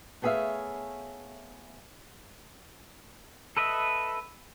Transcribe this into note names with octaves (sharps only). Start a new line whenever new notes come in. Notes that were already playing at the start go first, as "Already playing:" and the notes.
A3 B3 G#4 C#5 E5 F5
A4 B4 D#5 E5